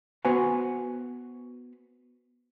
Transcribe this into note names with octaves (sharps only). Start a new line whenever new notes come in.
B3 F#4 B4 C5 F#5 G#5